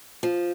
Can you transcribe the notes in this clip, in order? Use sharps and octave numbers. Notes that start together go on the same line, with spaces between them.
F3